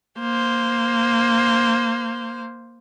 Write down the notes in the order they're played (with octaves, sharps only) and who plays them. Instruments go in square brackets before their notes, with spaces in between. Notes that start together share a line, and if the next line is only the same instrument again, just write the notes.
[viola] A#3 C5